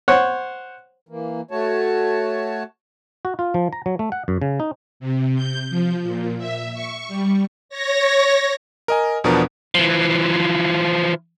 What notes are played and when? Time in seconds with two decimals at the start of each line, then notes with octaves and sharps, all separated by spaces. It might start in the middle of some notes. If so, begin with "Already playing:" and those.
0.08 C5 C#5 F#5
1.09 E3 A#3
1.51 A3 F#4 C#5 A5
3.25 F#4
3.39 F4
3.54 F3
3.73 A#5
3.86 F#3
3.99 A3
4.12 F#5
4.28 F#2
4.42 C#3
4.60 D#4
5.00 C3
5.36 G6
5.70 F3
6.03 A#2
6.38 E5
6.74 C#6
7.08 G3
7.69 C#5 A#6
8.88 A#4 D#5 G#5
9.24 E2 B2 F3 B3 D4 A#4
9.75 E3 F3